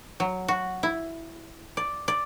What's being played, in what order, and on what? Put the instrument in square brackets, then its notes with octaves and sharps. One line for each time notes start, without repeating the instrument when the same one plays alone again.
[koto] F#3
F#4
E4
D5
D5